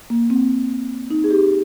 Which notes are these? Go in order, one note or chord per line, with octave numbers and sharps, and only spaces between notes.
A#3
C4
D#4
G#4
G4